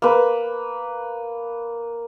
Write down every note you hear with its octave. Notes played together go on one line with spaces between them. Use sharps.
A#3 B4